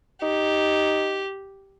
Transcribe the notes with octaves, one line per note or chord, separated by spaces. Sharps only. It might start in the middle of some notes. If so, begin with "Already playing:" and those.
D#4 G4